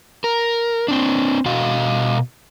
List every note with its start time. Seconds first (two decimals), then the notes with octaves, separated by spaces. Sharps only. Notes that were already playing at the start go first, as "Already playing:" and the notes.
0.24 A#4
0.88 C4 D4
1.45 B2 F#4 D#5 F5